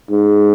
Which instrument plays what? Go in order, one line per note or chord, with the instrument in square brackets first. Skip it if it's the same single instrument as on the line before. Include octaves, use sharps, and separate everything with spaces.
[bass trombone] G#2